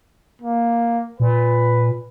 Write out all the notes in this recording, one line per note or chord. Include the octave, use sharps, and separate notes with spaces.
A#3
A#2 B4